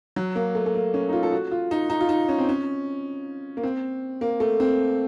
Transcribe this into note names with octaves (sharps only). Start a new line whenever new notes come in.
F#3
A#3
A3
A3
A#3
C#4
D#4
F4
A4
F#4
F4
D#4
D#4
F4
D#4
C#4
C4
C#4
A#3
C4
A#3
A3
C4